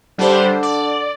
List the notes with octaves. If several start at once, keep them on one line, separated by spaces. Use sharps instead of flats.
D3 G3 D4 C5
D5